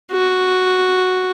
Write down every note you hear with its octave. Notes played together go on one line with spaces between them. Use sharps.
F#4